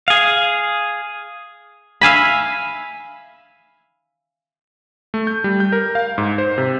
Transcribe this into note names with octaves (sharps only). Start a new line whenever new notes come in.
G#4 F5
E5 F5 G#5 B5
A3
G6
G3
G6
A#4
F5
G#2
C5
C3